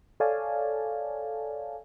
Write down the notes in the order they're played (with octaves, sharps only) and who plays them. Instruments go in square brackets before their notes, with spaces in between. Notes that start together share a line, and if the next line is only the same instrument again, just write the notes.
[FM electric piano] A4 C#5 D5 F5 G#5 A5